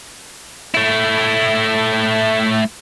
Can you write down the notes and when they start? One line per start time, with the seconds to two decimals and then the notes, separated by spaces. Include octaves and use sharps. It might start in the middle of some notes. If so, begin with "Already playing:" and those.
0.75 A3 E4